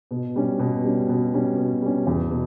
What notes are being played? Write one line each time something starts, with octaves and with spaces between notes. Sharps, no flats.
B2
G3 C#4
B2
G3 C#4
B2
G3 C#4
B2
G3 C#4
E2
B2